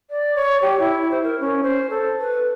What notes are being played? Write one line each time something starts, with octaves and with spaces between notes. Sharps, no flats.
D5
C#5
G4
E4
C5
A#4
C#4
C5
A4
B4